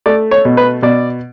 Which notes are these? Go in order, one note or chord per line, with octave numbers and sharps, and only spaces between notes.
A3 D5
C#5
B2
B4
B2 D5